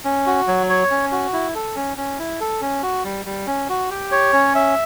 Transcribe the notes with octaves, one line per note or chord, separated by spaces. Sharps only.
C#4
F#4
F#3
C#5
C#4
F#4
E4
A4
C#4
C#4
E4
A4
C#4
F#4
G3
G3
C#4
F#4
G4
C#5
C#4
E5